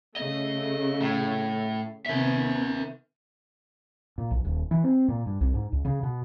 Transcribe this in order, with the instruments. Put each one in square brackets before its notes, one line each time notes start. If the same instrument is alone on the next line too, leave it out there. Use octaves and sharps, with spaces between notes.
[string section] C#3 A3 [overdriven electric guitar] D#5
[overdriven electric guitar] A2
[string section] C3 D#3 B3 [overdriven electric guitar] A#4 E5
[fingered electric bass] A#2
B1
D#1
E3
C4
A#2
G2
C2
G#2
C#2
C#3
B2